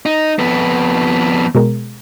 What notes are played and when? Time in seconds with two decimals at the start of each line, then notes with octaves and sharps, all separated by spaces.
0.06 D#4
0.39 F2 B3
1.55 B2 G#3 A#4